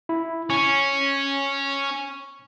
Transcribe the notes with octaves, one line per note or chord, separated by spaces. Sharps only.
E4
C#4 C#6